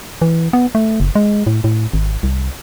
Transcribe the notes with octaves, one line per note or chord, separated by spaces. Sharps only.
E3
B3
A3
F#1
G#3
A2
A2
G#1
C2